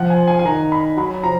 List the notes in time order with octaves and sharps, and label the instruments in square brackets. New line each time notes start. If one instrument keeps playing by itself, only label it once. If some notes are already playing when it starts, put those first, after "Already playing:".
Already playing: [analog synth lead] F3 [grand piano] F#5
[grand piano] G#5
G#5
G#5
[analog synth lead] D#3 [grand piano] A#5
[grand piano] B5
[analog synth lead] F#3 [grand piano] B5
[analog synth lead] F3 [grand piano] A#5